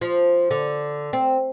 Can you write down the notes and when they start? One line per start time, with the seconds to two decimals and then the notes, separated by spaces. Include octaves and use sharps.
0.01 F3
0.51 D3
1.13 C4